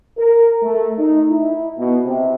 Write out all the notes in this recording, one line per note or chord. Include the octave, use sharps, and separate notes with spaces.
A#4
A3
D#4
E4
B2
C3